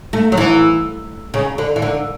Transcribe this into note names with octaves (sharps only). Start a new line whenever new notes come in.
A3
F#3
E3
C#3
D3
E3
D3